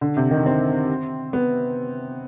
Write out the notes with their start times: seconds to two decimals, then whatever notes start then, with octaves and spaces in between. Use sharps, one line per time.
0.01 D3
0.17 C3
0.31 D#3
0.46 C4
1.33 B3